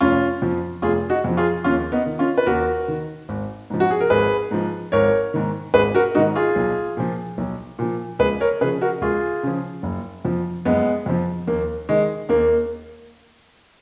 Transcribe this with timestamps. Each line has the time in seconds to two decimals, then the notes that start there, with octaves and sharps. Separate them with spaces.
0.01 F1 C#4 F4
0.42 F2 F3
0.82 F1 F4 G#4
1.10 D#4 F#4
1.24 F2 F3
1.37 F4 G#4
1.64 D#2 C#4 F4
1.92 B3 D#4
2.06 D#3
2.19 C#4 F4
2.38 B4
2.46 D#2 F#4 A#4
2.88 D#3
3.29 G#1
3.70 G#2 F3
3.80 F#4
3.91 G#4
4.01 A#4
4.10 G#1 G#4 B4
4.51 G#2 F3
4.92 G#1 A#4 C#5
5.34 G#2 D#3
5.74 G#1 G#4 B4
5.95 F#4 A#4
6.15 G#2 D#3 D#4 F#4
6.36 F4 G#4
6.56 B1
6.97 A#2 F3
7.38 B1
7.79 A#2 F3
8.19 C#2 G#4 B4
8.40 A#4 C#5
8.61 C#3 F3 G#4 B4
8.81 F#4 A#4
9.01 C#2 F4 G#4
9.43 C#3 F3
9.83 F#1
10.25 F2 F3
10.65 F#1 G#3 B3
11.06 F2 F3
11.47 D#2 A#3
11.89 D#3 G#3
12.29 D#2 A#3